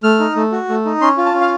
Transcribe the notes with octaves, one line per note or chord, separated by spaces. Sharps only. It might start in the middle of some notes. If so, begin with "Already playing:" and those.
A3 F6
D#4
A3
F#4
A3
D#4
C#4 C6
F4
A5
C#4
F5